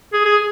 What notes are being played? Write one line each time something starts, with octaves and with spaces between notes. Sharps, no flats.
G#4
G#4